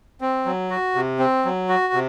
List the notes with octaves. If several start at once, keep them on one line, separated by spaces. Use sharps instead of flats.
C4
F#3
F#4
C3
C4
F#3
F#4
C3